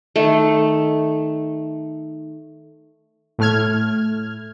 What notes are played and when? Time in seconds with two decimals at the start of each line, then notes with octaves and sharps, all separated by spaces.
0.16 D#3 A3
3.39 A2 A3 F6 G#6